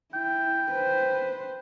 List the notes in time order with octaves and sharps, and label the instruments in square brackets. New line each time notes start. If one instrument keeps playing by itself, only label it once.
[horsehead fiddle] E4 [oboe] G5
[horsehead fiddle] B4 C5